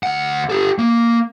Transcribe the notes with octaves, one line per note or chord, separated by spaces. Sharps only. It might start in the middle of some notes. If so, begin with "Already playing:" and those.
D2 F#5
G4 A4
A#3